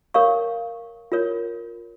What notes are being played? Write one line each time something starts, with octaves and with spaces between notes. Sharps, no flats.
A#4 C#5 F5 A#5 C#6
F4 A#4 C#5